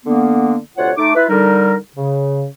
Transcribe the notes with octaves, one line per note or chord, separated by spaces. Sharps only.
D3 A#3 B3
D2 C3 F4 C#5 F#5
A3 D#4 D6
E4 F4 B4
D3 G3 D#4 A#4
C#3